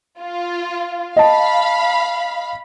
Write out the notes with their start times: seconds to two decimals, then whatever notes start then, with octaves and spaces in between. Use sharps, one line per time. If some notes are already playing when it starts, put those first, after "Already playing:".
0.20 F4
1.16 D#5 F5 A5 B5